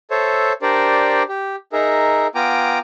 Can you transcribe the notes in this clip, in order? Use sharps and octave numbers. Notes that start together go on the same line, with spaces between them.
A4 C5 C#5 E5
D4 G4 A#4 C5 D5
G4
D#4 G#4 A#4 E5
B3 F4 G5 G#5 A#5 D6